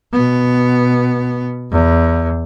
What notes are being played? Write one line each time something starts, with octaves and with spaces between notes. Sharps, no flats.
B2 B3
E2